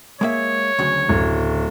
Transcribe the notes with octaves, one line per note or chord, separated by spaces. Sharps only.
G#3 A#3 C#5 E5
D2 C#3 F#3
D1